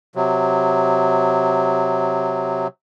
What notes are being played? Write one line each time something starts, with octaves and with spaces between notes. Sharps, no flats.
C3 F#3